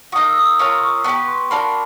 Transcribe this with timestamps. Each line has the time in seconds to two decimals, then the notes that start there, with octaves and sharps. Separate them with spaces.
0.12 A#3 D#4 F#4 D#6
0.29 E6
0.37 D#6
0.43 E6
0.59 C#4 F4 A#4
0.81 C#6
1.04 B3 D4 C#6
1.08 G4 B4
1.28 C6
1.50 A#3 D4 F#4 B5